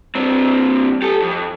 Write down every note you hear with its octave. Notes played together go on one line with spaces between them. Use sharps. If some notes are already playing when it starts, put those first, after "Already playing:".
G2 C4
G4 A4
F2